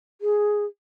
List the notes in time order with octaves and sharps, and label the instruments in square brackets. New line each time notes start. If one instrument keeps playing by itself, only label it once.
[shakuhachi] G#4